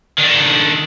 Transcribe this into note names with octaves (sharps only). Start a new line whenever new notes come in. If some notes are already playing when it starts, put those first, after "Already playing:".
D#3 D4